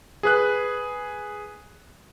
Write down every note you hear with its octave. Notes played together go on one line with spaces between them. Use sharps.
G#4 B4 F#6